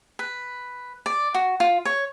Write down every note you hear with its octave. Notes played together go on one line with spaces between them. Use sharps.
B4
D5
F#4
F4
C#5